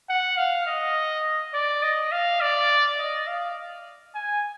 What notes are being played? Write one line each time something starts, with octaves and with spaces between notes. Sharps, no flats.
F#5
F5
D#5
D5
D#5
F5
D5
D#5
F5
G#5